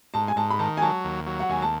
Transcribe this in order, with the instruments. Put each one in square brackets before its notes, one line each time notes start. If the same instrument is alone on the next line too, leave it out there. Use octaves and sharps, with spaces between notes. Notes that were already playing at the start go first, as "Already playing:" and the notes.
[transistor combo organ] G#2 [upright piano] A5
[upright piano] G#5
[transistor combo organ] G#2 [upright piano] A5
[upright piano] B5
[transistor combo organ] D#3 [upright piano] A5
[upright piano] G#5
[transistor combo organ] F#3 [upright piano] A5
[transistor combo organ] D#2
F#3
[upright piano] F#5
[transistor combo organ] D#2 [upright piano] G#5
[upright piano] A5